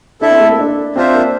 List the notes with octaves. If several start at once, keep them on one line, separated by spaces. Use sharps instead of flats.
D4 E4 A4 E5
C4
A3
A#3
D4
C4 D4 F4 C5 E5
A#3